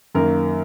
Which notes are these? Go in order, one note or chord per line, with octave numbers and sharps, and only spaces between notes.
F#2 D#3 A#3 A#4